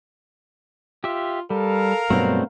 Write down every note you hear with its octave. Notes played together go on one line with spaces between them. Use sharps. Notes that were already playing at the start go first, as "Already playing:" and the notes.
F4 G4 E5
G3 A4 A#4 F5
G2 B2 F#3 A3 B3 C4 D4